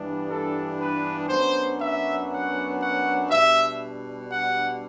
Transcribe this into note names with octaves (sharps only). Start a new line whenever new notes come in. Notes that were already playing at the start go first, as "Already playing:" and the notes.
Already playing: G2 E3 G3 B3 D4
A4
B4
F#2 F#3 B3 D4 C5
E5
F#5
F#5
B2 G3 D4 E5
F#5